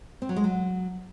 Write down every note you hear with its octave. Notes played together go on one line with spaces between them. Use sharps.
C4
F#3
G#3
F#3